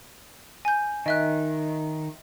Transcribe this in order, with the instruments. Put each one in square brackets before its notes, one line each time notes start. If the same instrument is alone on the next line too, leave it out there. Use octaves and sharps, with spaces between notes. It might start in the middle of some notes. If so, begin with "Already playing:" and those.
[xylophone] G#5 G6
[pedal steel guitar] D#3 [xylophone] D#5 E5 F#6